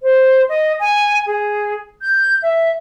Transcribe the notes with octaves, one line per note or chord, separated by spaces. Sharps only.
C5
D#5
G#5
G#4
G6
E5